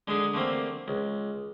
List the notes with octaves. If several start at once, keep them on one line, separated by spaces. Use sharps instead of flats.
D3 G#3 D4 D#4
D3 A3 A#3 C4
C#2